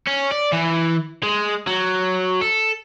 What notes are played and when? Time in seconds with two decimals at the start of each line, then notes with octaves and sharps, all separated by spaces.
0.07 C#4
0.31 D5
0.52 E3
1.23 G#3
1.67 F#3
2.41 A4